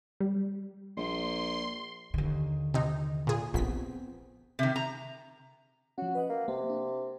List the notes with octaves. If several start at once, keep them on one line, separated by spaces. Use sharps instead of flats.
G3
A#1 C6
D#2 D3
C3 D#4
A#2 G#4
A#1 B3 C4 B6
C3 D#3
A#5
F3 C#4 F#4
B4 D#5 F#5
A#3
C3 A#3
D4